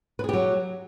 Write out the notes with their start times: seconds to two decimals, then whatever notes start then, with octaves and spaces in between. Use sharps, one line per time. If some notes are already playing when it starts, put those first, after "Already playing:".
0.19 B4
0.24 G#4
0.29 G4
0.33 F#3